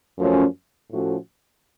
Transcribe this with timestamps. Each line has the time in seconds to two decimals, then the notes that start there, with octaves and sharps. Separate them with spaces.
0.19 F#2 F3 A3 C#4
0.90 A2 F3 A3 C#4 F#4